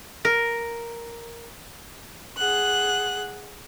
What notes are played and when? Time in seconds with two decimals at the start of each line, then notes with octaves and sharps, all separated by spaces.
0.25 A#4
2.37 G#4 F#5 F#6